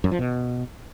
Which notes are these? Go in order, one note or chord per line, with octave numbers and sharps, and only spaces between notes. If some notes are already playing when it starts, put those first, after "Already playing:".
F#2
F3
B2